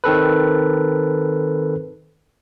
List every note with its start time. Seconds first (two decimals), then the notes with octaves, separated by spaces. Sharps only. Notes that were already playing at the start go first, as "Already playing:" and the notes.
0.04 D#3 C4 A4 B4